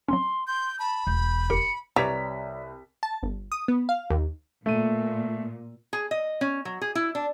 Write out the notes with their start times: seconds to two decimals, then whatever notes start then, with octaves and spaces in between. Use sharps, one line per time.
0.09 F#3 C4 C#4 C6
0.47 C6 G6
0.79 A5 B5
1.07 E1 G6
1.50 G1 G4 A#4 C#7
1.96 C2 G3 B4 C#5 A#5 B6
3.03 A5
3.23 G1
3.52 D#6
3.68 B3
3.89 F5
4.10 D#2
4.66 A#2 A3 D#7
5.93 G#4
6.11 D#5
6.41 C#4
6.65 F#3
6.81 G#4
6.95 E4
7.15 D4